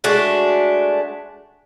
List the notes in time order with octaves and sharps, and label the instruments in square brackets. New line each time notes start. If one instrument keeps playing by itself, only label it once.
[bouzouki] G#3 A3 D4 F#4